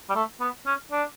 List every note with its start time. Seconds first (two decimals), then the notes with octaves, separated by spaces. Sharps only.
0.09 G3
0.15 A3
0.40 B3
0.66 C#4
0.91 D4